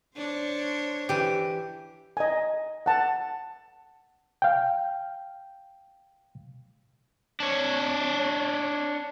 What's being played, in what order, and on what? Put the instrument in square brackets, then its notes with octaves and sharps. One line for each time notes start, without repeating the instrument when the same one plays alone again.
[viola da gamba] D4 C5 C#5
[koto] E3 G4
[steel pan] D#5 G#5
F#5 A5
[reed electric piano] F5 G5
[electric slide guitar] D4 C#5